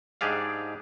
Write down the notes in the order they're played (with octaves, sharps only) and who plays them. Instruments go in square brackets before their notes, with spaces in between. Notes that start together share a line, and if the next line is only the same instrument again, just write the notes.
[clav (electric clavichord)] G#2 D4 G4 G#4 D5 F5